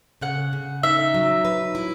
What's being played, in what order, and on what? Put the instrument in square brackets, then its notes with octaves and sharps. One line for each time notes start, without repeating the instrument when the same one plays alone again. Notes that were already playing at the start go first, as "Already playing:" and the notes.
[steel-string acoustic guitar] C#3 [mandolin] F#5
[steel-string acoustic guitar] C#3
[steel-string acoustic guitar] D#4 [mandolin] E5
[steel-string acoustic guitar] F#3
B4
E4